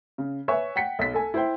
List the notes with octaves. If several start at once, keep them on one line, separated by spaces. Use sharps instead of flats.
C#3
B4 C#5 E5 G#5 C#6
F#5 G5 B6 C#7
B1 B6
A4 G#5
E4 C5 G5